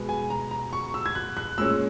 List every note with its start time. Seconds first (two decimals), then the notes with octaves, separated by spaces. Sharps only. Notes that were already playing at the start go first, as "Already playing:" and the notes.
Already playing: B2 G#3 B3
0.09 G#5
0.30 A#5
0.51 A#5
0.73 C#6
0.94 E6
1.06 G#6
1.15 F#6
1.37 F#6
1.58 A#2 G#3 C#4 E6